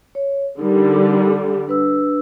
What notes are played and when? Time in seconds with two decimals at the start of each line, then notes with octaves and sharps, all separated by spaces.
0.15 C#5
0.59 D3 G3 D#4 A#4
1.67 D4 B4 E6